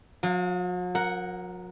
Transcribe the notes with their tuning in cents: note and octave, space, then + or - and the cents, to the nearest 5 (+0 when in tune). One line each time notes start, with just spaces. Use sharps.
F#3 -45 F5 +0
A#4 +0 F#5 +0